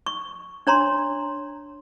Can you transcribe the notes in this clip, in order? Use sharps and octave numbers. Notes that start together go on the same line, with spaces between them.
C#6
D4 C#5 A#5 C6